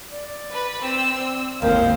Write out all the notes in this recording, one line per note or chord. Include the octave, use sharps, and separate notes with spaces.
D5
B4
C4 E6
G#1 D#2 A2 C4 C5 F5